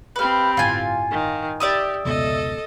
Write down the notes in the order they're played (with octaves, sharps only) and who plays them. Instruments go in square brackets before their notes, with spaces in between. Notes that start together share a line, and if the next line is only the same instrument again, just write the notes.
[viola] C4 G4 [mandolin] B4 F5
[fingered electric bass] G1 A2 [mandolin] F4 G#5
[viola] D#3
[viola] G4 [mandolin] D5 E5 D#6
[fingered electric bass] F1 C#2 B2 [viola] A4 D#5